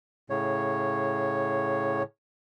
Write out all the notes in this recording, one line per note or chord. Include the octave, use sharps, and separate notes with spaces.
A2 C#3 C#5